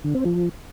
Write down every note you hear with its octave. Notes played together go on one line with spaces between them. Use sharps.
D3
C4
F3